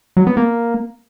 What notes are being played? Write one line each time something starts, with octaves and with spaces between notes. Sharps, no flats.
F#3
B3
A#3